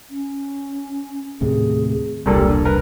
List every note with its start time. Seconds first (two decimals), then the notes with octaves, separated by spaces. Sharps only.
0.10 C#4
1.41 D#2 A2 C3 G#4
2.26 E1 C2 G2 A#2 G3 A4
2.48 D4
2.65 A#4 B4